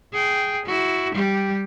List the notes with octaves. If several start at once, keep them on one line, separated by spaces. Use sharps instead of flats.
G#4 G5
E4 F#4
G3 G4